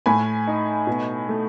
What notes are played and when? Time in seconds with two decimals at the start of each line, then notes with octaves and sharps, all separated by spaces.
0.06 A2 G#5 B5
0.47 D#4
0.87 B2
1.29 A3